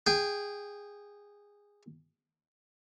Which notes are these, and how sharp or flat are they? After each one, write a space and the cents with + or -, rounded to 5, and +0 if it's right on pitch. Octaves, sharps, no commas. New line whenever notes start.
G#4 -15 G5 +0